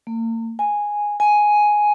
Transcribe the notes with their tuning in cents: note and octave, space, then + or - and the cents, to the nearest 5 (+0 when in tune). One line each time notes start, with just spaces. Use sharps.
A#3 -40
G#5 -5
G#5 +5